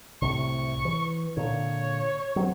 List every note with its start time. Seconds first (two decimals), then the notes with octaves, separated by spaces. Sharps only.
0.22 C2 A2 C3 C#6
0.85 E3
1.37 A#2 D3 C#5
2.36 F#3 C4